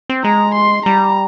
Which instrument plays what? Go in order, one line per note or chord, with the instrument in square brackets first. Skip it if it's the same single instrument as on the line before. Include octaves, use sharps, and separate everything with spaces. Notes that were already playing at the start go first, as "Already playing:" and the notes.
[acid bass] C4
[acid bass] G#3 [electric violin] A#5
[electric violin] C6
[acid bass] G3 [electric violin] A#5